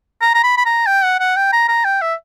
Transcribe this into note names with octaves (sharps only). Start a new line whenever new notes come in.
A#5
A#5
B5
B5
A#5
G5
F#5
F#5
G5
A#5
A#5
G5
E5